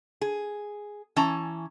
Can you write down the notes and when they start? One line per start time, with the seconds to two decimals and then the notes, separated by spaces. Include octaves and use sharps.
0.21 G#4
1.16 E3 C#4 A5 A#5